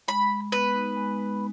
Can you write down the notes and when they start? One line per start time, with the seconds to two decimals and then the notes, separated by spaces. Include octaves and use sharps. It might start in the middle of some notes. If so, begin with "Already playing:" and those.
0.08 G#3 B5
0.30 G#3
0.52 B3 B4
0.74 D#4
0.97 G#3
1.19 G#3